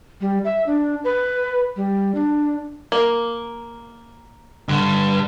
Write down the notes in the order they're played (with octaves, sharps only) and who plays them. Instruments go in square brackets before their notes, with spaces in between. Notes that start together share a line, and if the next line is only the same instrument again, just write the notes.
[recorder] G3
E5
D4
B4
G3
D4
[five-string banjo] A#3
[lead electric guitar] G2 [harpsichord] D3